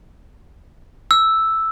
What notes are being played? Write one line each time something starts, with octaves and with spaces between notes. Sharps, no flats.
E6